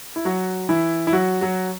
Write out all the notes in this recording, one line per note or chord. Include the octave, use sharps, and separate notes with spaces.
E4
F#3 F#4
E3 E4
E4
F#3 F#4
F#3 F#4